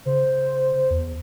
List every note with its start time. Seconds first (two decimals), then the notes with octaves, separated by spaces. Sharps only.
0.06 C#3 C5
0.90 E2